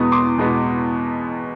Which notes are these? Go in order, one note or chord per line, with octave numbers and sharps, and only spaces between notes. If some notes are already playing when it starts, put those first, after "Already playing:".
Already playing: E2 B2 G#3 B3 C#6 D#6
C6 D6
E2 B2 G#3 B3